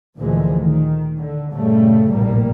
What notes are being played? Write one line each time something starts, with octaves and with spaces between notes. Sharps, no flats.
D2 A#2 E3 F3 G#3 A3
D#3
D3
G2 A#2 C#3 G3 A3
F1 A#1 F#2 A2 G3 A#3